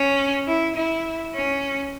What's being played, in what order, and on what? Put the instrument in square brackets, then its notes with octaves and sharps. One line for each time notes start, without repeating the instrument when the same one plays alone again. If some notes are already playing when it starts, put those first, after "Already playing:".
Already playing: [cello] C#4
E4
E4
C#4